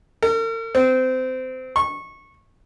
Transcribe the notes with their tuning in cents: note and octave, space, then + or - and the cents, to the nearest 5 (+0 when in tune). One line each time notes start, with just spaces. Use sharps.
A#4 -45
C4 -25
C#6 -20